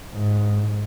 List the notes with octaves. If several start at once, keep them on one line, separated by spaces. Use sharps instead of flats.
G#2